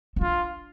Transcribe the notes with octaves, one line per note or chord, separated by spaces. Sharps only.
C4
D4 F4